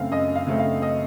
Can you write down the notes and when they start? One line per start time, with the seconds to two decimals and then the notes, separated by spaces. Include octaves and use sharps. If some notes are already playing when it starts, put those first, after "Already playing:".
Already playing: F#2 C#3 A3 C4 F5
0.12 F#2 D#5
0.35 F5
0.47 C#3 A3 C4
0.59 F5
0.82 D#5